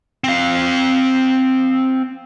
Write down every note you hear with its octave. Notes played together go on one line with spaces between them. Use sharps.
C4 F5